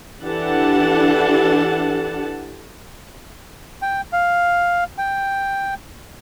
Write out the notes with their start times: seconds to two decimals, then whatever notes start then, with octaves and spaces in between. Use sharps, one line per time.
0.23 E3 D4 G4 A4 F#5 A5
3.82 G5
4.13 F5
4.98 G5